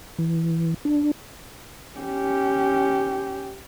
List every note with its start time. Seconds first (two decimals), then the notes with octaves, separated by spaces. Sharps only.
0.18 E3
0.85 D4
1.98 C#4 G4